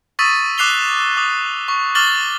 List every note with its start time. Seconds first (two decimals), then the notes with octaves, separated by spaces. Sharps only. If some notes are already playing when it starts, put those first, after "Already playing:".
0.19 C#6 D#6 E6 A6 B6 D#7
0.58 D6 F#6 C7 F7 G7
1.17 D6 D#6
1.68 C#6
1.95 C#6 D6 F6 A6 F#7 G7